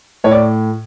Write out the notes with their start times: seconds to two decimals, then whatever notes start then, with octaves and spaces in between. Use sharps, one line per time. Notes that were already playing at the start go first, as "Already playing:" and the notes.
0.24 A2 C#5
0.31 D5